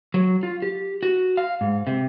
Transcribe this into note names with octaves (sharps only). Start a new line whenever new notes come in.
F#3
F4
G4
F#4
F5
G#2
C3